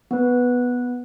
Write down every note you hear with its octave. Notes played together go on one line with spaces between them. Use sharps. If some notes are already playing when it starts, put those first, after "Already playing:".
B3 B4